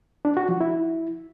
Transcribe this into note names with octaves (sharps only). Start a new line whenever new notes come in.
D4
F#4
F3
E4